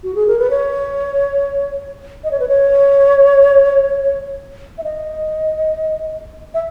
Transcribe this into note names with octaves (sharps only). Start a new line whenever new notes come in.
F#4
G#4
A#4
B4
C#5
D#5
C#5
B4
C#5
E5
D#5
E5